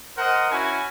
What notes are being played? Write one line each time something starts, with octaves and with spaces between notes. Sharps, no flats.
A#4 C5 D#5 F#5
C#4 E4 F#4 G#5